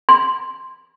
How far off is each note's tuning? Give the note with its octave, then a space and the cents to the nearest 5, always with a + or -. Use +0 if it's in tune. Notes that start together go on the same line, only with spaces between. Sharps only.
C6 +0